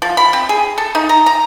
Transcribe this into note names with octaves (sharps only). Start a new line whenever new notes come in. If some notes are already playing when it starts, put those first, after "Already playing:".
F3
B5
C4
G#4
A4
D#4
A#5
A#5